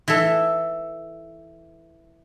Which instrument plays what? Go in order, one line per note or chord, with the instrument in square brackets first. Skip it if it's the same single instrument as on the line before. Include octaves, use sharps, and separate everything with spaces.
[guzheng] E3 A4